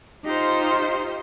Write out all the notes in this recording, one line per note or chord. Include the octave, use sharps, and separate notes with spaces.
D#4 F4 G4 C5